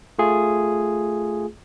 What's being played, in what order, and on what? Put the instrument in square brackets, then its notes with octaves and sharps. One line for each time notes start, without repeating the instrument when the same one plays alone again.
[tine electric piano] A3 F4 G#4